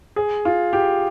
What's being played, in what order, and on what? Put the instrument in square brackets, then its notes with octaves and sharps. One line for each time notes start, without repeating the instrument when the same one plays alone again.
[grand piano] G#4
F4
G4